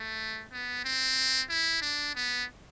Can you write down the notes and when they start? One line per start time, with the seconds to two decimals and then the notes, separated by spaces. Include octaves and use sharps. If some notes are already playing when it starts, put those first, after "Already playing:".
Already playing: A3
0.52 B3
0.85 C4
1.49 E4
1.82 D4
2.15 B3